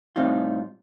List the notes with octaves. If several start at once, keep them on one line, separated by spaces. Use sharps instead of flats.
A2 G3 C4 D#4 F4